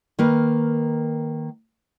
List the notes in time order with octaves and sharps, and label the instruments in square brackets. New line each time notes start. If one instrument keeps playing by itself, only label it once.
[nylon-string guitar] D#3 A#3 A#4 B4